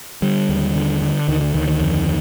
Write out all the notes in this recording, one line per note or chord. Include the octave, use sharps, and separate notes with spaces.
D3 G3
D#2
D3
D3
D2 D#3
D3
D2 D#3
D#3
F2